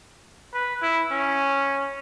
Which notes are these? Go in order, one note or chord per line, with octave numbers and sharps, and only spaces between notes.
B4
E4
C#4